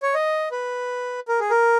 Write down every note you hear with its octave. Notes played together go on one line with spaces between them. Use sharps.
C#5
D#5
B4
A#4
G#4
A#4